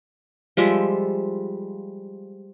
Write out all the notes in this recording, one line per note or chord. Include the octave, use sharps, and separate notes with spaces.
F3 G3 G#3 E5